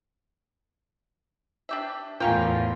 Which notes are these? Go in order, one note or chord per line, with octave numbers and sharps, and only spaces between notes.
D4 G4 E5
E2 A2 C#4 F4 A#4 G5